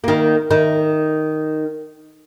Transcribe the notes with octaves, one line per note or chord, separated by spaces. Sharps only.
D#3 A#3
D#3